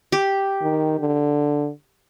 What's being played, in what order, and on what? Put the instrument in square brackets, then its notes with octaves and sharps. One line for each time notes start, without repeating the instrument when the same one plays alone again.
[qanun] G4
[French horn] D#3
D3